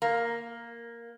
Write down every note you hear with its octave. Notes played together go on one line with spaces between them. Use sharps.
A#3